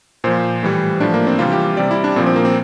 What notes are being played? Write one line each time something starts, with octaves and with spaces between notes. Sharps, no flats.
A#2 F3 C5
A2 E3 G3
A2 F3 D4
A#3
C4
C3 E3 G3 F4
G4
C3 G3 D5
E4
D4
A#2 F3 C4
C4
A#3
C4